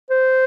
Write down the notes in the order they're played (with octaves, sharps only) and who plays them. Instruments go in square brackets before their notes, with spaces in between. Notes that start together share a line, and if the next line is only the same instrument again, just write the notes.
[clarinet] C5